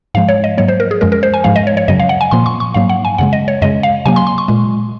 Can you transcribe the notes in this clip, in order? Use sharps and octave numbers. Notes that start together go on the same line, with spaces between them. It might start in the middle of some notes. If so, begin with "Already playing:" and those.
G#2 F3 G#3 F5
C#5
D#5
G#2 F#3 A#3 C#5
C5
A#4
G#4
F#2 F3 G#3 A#4
A#4
C5
G#5
G#2 F3 G#3 F5
D#5
C#5
C#5
F#2 C#3 F#3 D#5
F5
F#5
G#5
A#2 F3 A#3 C6
C#6
C#6
G#2 F#3 A#3 F5
F#5
G#5
F#2 C#3 G#3 F#5
D#5
C#5
F#2 C#3 G#3 D#5
F5
C3 F#3 A#3 G#5
C6
C6
C#6
A#2 G#3